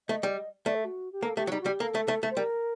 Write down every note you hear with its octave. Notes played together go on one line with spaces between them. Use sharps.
A3 D#5
G3
A3 D5
A4
F#4
G4
A#3 A4
A3 G4
F#3
G3 D#4
F#4
G3
G4
A#3 A4
A3
A3
A3
C5
G3 A#4